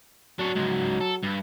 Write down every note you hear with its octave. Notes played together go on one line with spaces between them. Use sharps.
F#3 D4 C#5
C#2 G#2
A4
G2